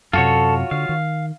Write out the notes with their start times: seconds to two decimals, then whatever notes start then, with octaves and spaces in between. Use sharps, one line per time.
0.13 F#2 C3 F4 F#4 A4 C#5
0.71 D3 F5
0.89 D#3